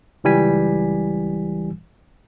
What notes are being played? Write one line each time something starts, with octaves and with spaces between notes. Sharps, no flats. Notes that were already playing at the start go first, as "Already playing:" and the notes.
C#2 E3 G3 G#5 B6